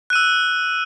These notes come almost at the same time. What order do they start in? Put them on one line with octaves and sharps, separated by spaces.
F#6 D#7 E6